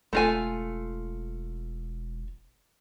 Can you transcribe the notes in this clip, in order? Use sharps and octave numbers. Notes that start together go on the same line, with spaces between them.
E1 A3 F4 G#5